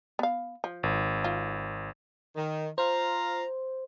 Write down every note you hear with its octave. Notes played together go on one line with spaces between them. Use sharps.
B3 F5
F3
G#1
F4
D#3
F4 C5 F5 A#5